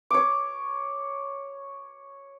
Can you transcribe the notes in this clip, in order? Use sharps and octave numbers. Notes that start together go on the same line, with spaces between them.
C#5 D6